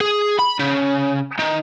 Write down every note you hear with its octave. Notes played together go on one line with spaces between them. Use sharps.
G#4
B5
C#3
D#3